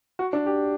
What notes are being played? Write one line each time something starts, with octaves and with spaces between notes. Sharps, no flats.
F#4
D4
G4